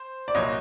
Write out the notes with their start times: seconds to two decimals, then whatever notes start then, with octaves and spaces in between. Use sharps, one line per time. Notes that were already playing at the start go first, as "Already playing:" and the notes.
Already playing: C5
0.28 D5
0.35 C2 A#2 F#3 C#5 D#5